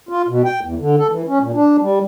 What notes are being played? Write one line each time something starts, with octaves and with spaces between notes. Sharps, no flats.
F4
B2
G5
E2
D3
A4
E3
C#4
A#2
D4
G3